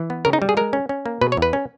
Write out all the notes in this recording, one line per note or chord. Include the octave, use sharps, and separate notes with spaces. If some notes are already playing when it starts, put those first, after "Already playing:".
Already playing: E3
B3
C#3 A#4
D#4
G3
G#4
G#3 A#4
C#4
C#4
A#3
B2 B4
C#5
E2 B4
C#4